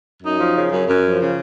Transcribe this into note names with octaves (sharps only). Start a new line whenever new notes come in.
F#2 D#4
F3
C#3
F#2
F#2
F3
C#3